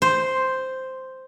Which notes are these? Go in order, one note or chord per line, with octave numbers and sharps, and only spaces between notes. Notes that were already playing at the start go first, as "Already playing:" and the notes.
C5